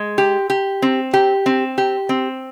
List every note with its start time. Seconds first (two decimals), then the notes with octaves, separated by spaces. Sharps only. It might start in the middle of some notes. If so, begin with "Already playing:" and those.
Already playing: G#3
0.18 G4
0.50 G4
0.82 C4
1.14 G4
1.46 C4
1.78 G4
2.09 C4